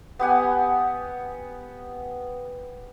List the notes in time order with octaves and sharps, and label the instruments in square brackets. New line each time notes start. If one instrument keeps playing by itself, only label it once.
[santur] B3 G4 F#5 G#5